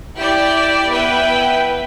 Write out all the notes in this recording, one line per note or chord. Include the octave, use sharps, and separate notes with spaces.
E4 G4 D5 G5
B3 E4 B4 E5 G5